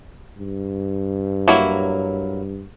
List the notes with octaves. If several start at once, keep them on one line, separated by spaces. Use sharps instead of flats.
G2
F#3 A#3 E4